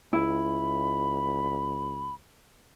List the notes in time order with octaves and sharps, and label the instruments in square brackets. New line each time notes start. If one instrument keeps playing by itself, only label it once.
[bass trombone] C#2 [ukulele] E4 [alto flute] B5